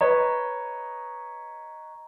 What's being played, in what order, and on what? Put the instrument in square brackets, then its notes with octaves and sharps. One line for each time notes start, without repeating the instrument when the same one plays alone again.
[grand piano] B4 C#5 D#5 [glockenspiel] A#5